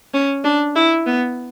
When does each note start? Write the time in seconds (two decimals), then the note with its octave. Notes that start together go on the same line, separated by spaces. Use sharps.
0.14 C#4
0.44 D4
0.75 E4
1.06 B3